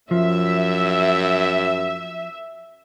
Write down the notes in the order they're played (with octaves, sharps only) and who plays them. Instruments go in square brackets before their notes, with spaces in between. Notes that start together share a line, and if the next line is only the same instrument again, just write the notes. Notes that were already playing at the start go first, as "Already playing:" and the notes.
[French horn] F#2 [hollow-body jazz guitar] F3 [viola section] E5